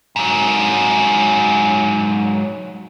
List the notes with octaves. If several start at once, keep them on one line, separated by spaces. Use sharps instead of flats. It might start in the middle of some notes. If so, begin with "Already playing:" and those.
G#2 F#3